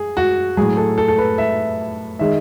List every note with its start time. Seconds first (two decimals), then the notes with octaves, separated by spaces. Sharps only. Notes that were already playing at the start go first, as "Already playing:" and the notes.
Already playing: G#4
0.17 F#4
0.57 A2 F#3 G#4
0.77 A4
0.98 A4
1.08 A4
1.18 B4
1.38 E5
2.19 D#3 G#3 E5